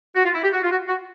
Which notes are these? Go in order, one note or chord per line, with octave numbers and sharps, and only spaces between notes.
F#4
F4
E4
G4
F#4
F4
F#4
F#4